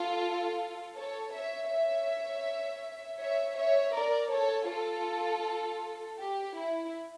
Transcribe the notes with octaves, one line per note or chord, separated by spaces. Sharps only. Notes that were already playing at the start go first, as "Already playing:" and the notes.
Already playing: F4 A4
A4 C#5
C#5 E5
C#5 E5
C#5 E5
C#5 E5
A#4 D5
A4 C#5
F4 A4
G4
E4